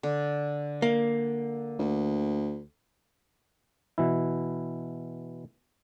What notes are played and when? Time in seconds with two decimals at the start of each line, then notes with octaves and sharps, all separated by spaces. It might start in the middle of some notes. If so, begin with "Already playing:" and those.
0.03 D3
0.82 A#3
1.79 D2
3.98 B2 E3 E4